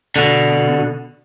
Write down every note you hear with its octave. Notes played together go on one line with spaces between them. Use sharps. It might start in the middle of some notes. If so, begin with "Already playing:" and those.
B2 D3